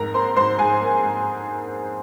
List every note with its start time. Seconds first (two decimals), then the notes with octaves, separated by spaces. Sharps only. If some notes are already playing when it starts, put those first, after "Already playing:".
Already playing: F2 G#2 A#4 A#5
0.14 A#3 C5 C6
0.36 G#2 C5 C6
0.59 G#2 G#4 G#5
0.81 A#3
1.04 G#2